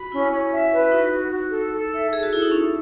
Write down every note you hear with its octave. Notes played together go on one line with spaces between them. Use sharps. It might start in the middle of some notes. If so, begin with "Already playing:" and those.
Already playing: F#4 B5
C#4 E4
C#4
E5
B4
D#4 F#4
F#4
F#4
A4
A4
E5
G#4 A4
F#4
E4 A4
D#4
C#4 E4